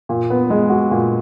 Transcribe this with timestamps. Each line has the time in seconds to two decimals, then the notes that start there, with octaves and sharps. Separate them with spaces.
0.09 A#2
0.30 B3
0.50 G#3
0.70 F#4
0.91 A#2